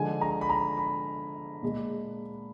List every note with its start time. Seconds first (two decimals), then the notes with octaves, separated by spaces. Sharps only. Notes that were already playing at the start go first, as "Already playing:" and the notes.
Already playing: D3 F3 G#3 G#5
0.21 A#5
0.41 B5
0.50 A#5
0.77 B5
1.62 A#2 G#3